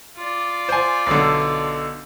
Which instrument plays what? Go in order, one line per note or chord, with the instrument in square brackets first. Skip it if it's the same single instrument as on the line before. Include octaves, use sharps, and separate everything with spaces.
[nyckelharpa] F4 D5
[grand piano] C5 G#5
B1 D3